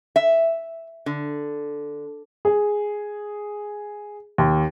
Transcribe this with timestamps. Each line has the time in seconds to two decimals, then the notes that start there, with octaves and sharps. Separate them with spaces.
0.16 E5
1.06 D3
2.45 G#4
4.38 D#2